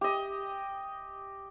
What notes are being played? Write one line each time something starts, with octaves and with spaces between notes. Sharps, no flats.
G4 D#5